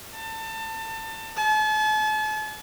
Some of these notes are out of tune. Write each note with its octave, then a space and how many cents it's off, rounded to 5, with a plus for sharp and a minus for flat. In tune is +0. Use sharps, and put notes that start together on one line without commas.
A5 +30
A5 -40